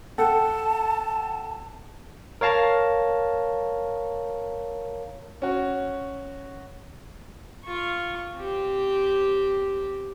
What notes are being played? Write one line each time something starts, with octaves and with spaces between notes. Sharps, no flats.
A4 F#5 G5 A5
A#4 C#5 F5 A5 A#5
C#4 F#4
F4 C#6
C4 G4